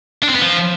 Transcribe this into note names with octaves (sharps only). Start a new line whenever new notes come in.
D4
C4
B3
F3